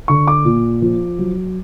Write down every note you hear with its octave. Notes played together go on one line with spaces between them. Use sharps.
D3 C#6
D6
A#2
F3
F#3